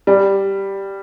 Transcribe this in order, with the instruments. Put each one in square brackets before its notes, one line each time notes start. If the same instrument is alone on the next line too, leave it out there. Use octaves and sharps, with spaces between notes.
[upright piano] G3